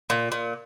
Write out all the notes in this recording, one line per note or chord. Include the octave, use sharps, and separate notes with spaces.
A#2
A#2